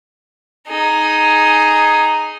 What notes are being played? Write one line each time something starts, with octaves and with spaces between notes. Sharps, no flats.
D#4 G#4